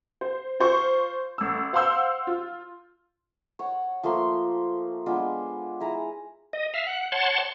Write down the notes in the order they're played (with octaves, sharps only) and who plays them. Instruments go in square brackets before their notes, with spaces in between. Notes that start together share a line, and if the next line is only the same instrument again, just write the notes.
[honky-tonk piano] C5
F4 C5 C#6
A1 E6
C5 F5 F#5 C6 E6 G6
F4
[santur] C#5 F#5
F3 A3 A#3 C6
G#3 B3 D4 F4
E4 G#4 A#5
[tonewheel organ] D#5
E5 F5
F#5
C#5 F#5 A5 C6